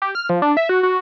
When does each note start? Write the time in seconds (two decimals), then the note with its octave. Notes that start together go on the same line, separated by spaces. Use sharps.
0.02 G4
0.15 F6
0.29 F3
0.42 D4
0.57 E5
0.69 F#4
0.83 F#4